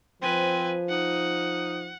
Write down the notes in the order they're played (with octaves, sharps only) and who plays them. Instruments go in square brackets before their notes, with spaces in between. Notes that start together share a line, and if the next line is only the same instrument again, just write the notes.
[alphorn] F3 [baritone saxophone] C4 [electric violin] B4 G#5
[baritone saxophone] D#4 [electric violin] F#5